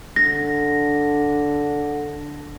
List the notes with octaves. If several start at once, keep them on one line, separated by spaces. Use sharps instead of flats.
D3 A#6